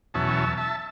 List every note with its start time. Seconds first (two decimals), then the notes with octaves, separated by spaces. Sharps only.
0.14 E2 B2 F#3 C#4 E5 A5
0.57 E5 A5